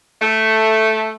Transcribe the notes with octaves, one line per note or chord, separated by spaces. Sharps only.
A3